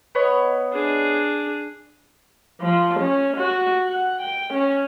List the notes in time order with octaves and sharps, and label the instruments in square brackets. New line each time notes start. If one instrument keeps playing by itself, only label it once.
[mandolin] B3 C#5 D#5
[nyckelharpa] D4 G#4
[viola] F3
C#4
F#4
F#5
G5
C#4